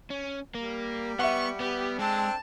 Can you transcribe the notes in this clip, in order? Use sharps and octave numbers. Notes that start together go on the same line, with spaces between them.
C#4
G3 A#3
B3 E5 F#5 C#6
B3 G4
G#3 C4 D4 A4 A5